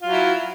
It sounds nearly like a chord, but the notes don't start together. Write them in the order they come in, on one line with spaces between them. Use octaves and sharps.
F4 F#3 E4